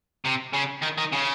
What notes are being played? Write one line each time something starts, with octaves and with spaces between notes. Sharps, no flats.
C3
C#3
D#3
D#3
C#3